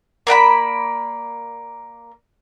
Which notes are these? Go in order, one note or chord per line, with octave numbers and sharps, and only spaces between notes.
A#3 D5 F#5 B5